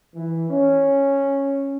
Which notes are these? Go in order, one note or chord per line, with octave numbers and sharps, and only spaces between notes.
E3
C#4